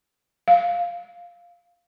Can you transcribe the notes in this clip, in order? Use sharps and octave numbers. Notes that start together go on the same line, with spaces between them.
F5